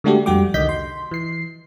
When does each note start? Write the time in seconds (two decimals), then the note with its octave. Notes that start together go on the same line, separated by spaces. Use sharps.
0.04 D3 G#3 A3 D4 F#4 G4
0.26 F2 G3 F#4 G5 D6
0.54 C2 D3 D#3 D#5 G6 B6
0.69 C6
1.11 E3 C7